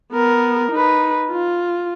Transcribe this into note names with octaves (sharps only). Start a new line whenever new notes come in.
B3 A#4
D#4 B4
F4